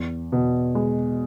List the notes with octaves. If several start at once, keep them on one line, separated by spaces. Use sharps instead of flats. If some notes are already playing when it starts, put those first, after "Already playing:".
Already playing: E2
B2
G#3